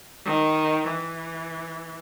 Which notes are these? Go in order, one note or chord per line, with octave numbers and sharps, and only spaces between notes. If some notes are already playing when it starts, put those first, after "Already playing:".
D#3
E3